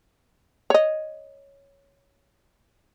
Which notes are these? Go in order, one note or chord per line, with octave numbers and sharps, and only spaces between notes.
C#5 D#5